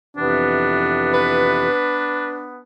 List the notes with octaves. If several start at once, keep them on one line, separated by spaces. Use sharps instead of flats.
F2 C3 E3 B3 D4
B4